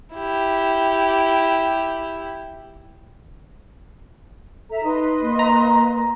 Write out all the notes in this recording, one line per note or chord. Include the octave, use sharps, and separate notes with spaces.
E4 G4
A4 E5 A#5
D#4 B4 D#5 C6
A#3
A#5